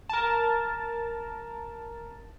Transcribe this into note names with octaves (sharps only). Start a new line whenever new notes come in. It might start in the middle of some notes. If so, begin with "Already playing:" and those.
A#4 A5